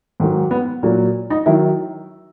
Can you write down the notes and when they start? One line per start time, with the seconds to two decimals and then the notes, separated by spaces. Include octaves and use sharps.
0.20 G#2 D#3 F#3
0.51 B3
0.83 A#2 F#3
1.30 D#4
1.46 D#3 F#3 E4